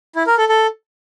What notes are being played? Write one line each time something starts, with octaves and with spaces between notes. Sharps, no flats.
E4
A#4
A4
A4